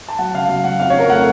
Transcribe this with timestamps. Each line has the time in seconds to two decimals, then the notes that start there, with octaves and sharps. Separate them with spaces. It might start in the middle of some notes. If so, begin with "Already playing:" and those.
0.09 A5
0.18 F#3 F#5
0.34 C#3 F5
0.49 F#3 F5
0.64 F#3 F#5
0.80 F2 F5
0.90 F2 C#5
0.99 A#4
1.09 A3 F#5